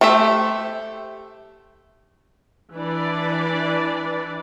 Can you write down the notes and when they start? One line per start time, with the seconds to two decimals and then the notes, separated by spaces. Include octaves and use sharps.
0.01 A3 G4 C5 E5
2.73 E3 D4 B4 D5